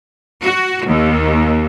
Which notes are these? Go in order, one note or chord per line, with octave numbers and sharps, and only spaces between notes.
F#4
D#2